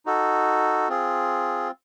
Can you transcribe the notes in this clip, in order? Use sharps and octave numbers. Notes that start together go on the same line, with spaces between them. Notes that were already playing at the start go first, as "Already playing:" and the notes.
D#4 F#4 A4
C4 F4 G#4